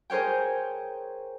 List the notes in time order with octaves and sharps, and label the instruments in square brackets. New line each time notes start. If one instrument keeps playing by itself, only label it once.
[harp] G#4 A#4 C5 C#5 G5